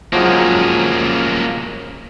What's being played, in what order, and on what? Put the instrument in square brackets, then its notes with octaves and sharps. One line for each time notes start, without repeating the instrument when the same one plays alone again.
[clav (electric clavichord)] F3 F#3 G#3 [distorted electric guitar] A#3 C#4